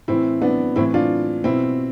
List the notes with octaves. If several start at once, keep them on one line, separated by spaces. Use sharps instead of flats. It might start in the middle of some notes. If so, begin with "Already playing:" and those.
A2 E3 C4 E4
B3 D4
A2 E3 C4 E4
D4 F4
B2 C4 E4